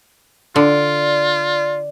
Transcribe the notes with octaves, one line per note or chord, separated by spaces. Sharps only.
D3 F4 D5